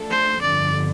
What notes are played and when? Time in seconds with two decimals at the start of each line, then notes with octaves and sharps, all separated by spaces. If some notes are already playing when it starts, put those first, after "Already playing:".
Already playing: F3 A3 D4 A4
0.11 C5
0.41 G1 F2 D3 D5